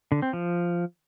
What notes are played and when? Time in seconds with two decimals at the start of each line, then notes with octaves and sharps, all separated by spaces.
0.12 D3
0.22 C4
0.33 F3